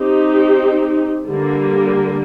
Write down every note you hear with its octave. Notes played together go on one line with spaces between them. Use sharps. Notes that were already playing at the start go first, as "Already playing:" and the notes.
Already playing: C4 D#4 G4
D3 G3 A#3